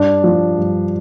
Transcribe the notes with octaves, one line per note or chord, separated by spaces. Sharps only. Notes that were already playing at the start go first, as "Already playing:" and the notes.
Already playing: G2 D4
F3
G2